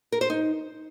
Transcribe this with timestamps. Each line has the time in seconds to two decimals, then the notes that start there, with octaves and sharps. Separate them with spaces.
0.12 A#4
0.21 C5
0.30 D#4